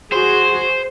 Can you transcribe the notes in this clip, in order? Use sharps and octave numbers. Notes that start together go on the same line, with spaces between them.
F#4 G#4 C5